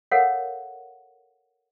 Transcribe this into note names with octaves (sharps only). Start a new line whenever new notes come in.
A4 A#4 C#5 F5 F#5